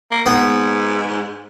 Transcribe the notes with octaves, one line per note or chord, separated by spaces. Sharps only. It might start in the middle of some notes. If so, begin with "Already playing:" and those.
A#3
G#2 B3